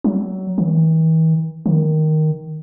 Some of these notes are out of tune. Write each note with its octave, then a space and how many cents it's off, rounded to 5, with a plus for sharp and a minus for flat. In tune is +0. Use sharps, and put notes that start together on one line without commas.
F#3 +25
E3 -45
D#3 +0